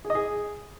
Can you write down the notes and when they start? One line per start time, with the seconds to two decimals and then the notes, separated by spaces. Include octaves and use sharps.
0.05 G#4
0.10 D#5
0.15 G#4